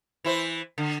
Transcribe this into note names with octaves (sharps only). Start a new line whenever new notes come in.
E3 E4 C5
D3